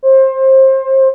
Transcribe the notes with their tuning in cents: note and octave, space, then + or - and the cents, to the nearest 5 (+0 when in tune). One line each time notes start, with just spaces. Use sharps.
C5 +25